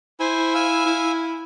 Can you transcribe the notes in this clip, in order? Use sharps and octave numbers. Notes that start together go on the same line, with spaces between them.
E4 C5 G#5
F5 G#5 E6
E4